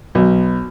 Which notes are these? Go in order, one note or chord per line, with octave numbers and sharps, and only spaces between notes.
B1